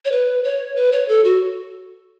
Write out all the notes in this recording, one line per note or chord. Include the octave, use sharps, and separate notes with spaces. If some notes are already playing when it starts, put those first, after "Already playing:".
C#5
B4
C#5
B4
C#5
A4
F#4